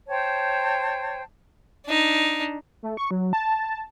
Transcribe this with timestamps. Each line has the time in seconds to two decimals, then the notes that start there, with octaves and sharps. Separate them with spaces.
0.08 C5 C#5 G5 A5
1.86 D4 D#4
2.83 A3
2.97 C#6
3.11 F#3
3.33 A5